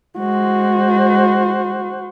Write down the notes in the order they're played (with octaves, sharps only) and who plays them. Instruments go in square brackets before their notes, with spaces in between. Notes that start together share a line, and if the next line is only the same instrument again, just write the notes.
[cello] G#3 [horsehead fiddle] F#4 C5